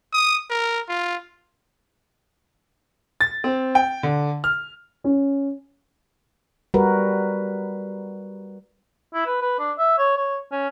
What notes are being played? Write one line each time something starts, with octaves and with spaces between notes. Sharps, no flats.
D#6
A#4
F4
A6
C4
G5
D3
F6
C#4
G3 F#4 A#4 B4
E4
B4
B4
D4
E5
C#5
C#5
C#4